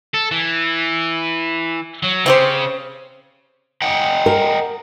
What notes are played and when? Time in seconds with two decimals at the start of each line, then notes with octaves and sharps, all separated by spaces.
0.14 A4
0.31 E3
2.04 F#3
2.26 C#3 C4 G4 C5
3.82 D#5 F#5 G5
4.26 A#4